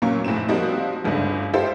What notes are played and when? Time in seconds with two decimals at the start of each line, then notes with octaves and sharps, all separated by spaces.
0.02 A#2 F#3 A#3 C#4 C#6
0.24 F1 A2 C3 C4 E7
0.49 F3 G3 A#3 C4 D#4 F#4
1.05 G1 C#2 G#2 A3 D4
1.53 E4 F4 G4 A4 C5 D#5